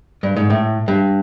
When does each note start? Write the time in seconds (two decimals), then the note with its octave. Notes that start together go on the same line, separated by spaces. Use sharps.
0.23 G2
0.36 G#2
0.50 A2
0.88 G2